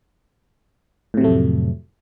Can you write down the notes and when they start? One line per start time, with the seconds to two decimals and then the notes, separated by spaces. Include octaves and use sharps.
1.14 A2
1.17 C3
1.21 F#3
1.24 A3
1.28 F2